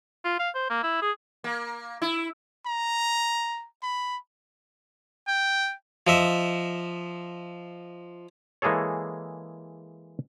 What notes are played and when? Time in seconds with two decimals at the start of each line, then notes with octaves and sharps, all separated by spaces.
0.25 F4
0.40 F5
0.55 C5
0.70 A#3
0.83 E4
1.02 G#4
1.44 A#3
2.02 E4
2.67 A#5
3.83 B5
5.28 G5
6.07 F3 D#5 E5
8.62 E3 G#3 A#3 G#4 A4 C#5